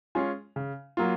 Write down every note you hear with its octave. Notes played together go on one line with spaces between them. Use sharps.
G#3 C#4 F4 G#4
C#3
F#3 A#3 F4